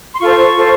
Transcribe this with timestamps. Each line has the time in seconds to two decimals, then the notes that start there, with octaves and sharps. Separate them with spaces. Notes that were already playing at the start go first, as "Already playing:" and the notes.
0.14 C6
0.21 F4 A4 C5 C#6
0.56 F4 A4 C5